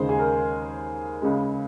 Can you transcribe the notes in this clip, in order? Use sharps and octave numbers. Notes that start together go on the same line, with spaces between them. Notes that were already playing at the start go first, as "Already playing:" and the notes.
Already playing: D#2 C#3 G#3 C5
G#4
A#4
C#2 C#3 G#3